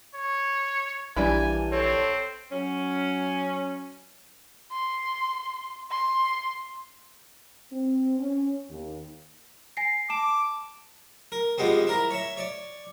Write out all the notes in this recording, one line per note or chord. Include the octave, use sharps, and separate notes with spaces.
C#5
A#1 E3 G3 D4 G#5
C4 A4 C#5
F#3 C#4
C6
C6
C4
C#4
D#2
G#5 A#6 C7
A5 D6 E7
A#4
F2 G3 G#3 B3 C4
E4 A#4 A#5
C#5 E5
C#5 D5